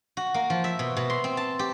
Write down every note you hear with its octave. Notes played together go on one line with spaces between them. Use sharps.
F#4
A#3
F3
E5
B2
B2
C6
C4
A5
G4